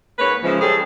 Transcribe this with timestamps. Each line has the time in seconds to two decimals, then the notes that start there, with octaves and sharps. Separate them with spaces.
0.18 G#2 A#3 B4 C#5
0.43 C#3 E3 F3 G#3
0.61 G3 C#4 G#4 A4